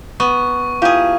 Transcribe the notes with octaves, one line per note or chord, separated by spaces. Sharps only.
B3 C#6
E4 F4 G4 G#4 F5